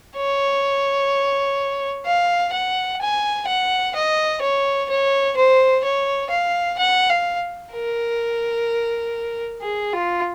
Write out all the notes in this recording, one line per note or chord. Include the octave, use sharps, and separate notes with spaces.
C#5
F5
F#5
G#5
F#5
D#5
C#5
C#5
C5
C#5
F5
F#5
F5
A#4
G#4
F4